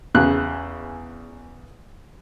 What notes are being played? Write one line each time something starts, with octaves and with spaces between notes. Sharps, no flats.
E2 C#3 F#6